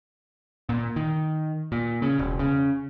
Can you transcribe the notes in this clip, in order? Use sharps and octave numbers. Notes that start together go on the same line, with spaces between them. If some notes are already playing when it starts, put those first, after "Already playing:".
A#2
D#3
A#2
C#3
E1
C#3